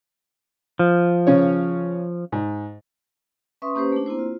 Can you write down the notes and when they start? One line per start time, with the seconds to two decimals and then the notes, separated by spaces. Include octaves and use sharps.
0.79 F3
1.27 C#3 C#4 C#5
2.32 G#2
3.62 C#4 B4 E5 C6 C#6 D#6
3.75 A#3 C#4 G4 B4 C5
3.92 A3 D4
4.06 A#3 C4 E4 C5
4.19 F4